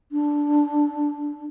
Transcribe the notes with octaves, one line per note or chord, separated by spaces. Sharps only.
D4